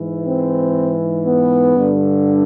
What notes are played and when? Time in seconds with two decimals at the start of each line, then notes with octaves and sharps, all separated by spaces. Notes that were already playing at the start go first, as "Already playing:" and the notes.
Already playing: G#2 E3
0.26 C4
1.26 B3
1.74 G2 D3